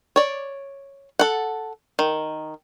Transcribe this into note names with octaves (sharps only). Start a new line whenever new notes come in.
C#5 D5
A4 F#5
D#3